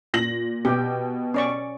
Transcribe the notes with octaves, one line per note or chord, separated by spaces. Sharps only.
A#2 A#6 F#7
B2 G4 G5
C#4 D5 C#6